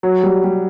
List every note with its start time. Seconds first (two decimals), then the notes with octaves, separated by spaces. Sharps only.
0.03 F#3
0.23 G3
0.44 G3